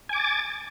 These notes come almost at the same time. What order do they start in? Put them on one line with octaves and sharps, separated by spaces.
G#5 D6 A6